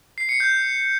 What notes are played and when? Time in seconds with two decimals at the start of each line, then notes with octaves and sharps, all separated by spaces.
0.18 C7
0.29 C#7
0.40 G6